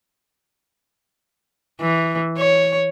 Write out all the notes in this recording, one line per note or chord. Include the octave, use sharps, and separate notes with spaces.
E3
C#5